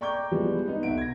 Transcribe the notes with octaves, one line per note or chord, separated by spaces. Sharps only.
D5 G5 A#5 C#6 D6 G6
E3 F3 G3 G#3 B3
B3 D#4
B1 E5 F#5 D7
G#6 A#6